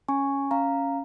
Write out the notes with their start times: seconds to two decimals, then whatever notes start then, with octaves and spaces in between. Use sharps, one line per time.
0.08 C#4 G#5 C#6
0.51 C#4 F5 A#5